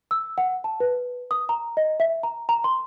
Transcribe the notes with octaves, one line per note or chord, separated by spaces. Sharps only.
E6
F#5
A5
B4
D#6
A#5
D#5
E5
A#5
A#5
C6